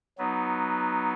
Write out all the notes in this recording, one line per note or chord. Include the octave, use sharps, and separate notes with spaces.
F#3 B3 D#4